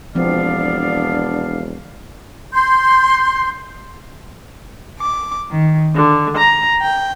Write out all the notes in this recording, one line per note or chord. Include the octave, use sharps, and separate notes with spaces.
E1 F3 B3 C4 D4 D5 F5
C6 G6
D6
D#3
D3
A#5
G5